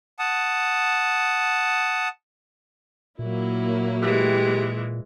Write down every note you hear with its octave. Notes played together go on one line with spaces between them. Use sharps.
F#5 A5 D#6
A#2 F#3 A#3 E4
E3 G#3 G4